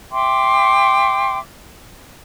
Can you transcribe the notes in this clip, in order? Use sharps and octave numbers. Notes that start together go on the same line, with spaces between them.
E5 G5 C6 D6